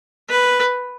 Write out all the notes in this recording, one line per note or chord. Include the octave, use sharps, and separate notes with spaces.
B4